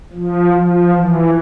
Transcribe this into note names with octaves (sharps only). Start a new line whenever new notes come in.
F3
F3
E3